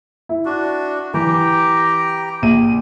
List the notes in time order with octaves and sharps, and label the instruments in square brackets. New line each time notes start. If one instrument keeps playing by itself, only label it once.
[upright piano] E4
[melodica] D4 F#4
[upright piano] E3 [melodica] G4 G5 A#5
[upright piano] A#1 D#7